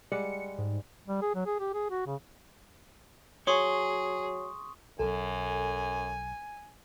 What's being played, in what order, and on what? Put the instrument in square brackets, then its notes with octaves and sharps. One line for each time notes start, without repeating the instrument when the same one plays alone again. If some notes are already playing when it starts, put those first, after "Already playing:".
[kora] G3 G#3 F#5 [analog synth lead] C#7
[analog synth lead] G#2
[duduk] G3
G#4
F#3
G#4
G4
G#4
F#4
C#3
[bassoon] F#3 [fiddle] G#4 [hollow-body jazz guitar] C#5 [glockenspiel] C6 C#6 D#6
[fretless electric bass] B1 F#3 [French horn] F#2 [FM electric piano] A4 [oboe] G#5